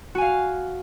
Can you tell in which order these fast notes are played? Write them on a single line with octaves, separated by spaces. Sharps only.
F#4 G#5 F5